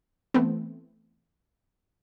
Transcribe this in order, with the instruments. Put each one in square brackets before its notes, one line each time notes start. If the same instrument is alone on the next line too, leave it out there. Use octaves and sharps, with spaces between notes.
[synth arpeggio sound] E3 A3 B3 C4